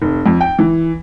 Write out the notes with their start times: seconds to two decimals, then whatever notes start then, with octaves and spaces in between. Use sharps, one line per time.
0.02 F1
0.26 F2
0.41 G5
0.59 E3